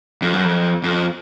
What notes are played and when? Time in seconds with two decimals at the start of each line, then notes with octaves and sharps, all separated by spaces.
0.22 F2
0.34 F#2
0.45 F2
0.83 F2